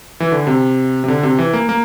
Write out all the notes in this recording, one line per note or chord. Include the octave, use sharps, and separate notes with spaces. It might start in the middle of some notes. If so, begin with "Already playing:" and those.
E3
D3
C3
C3
D3
C3
E3
A#3
A#3